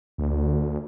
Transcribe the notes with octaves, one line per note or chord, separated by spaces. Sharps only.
D2